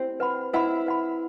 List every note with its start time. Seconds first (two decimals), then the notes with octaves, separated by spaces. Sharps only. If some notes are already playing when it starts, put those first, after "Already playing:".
Already playing: C4 E4 G4 C5
0.20 B4 F#5 B5
0.53 E4 B4 E5 F#5 B5
0.86 B4 F#5 B5